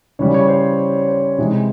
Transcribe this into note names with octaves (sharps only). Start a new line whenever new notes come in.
C#3 E3 G3 C#5
C#5
C5
C5
C3 E3 G#3